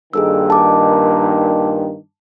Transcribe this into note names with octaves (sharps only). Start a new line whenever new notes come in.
G2 A#2 D#3 G#4 A4 E6
A5 D6